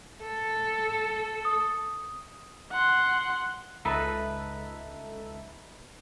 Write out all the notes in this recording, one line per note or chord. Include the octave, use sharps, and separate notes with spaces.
A4
D#6
F#5 C6
C#2 D#4 A4 B4 E5